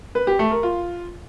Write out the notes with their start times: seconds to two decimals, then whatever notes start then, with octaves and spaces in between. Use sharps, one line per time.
0.15 B4
0.27 G4
0.39 A3
0.51 A#4
0.63 F4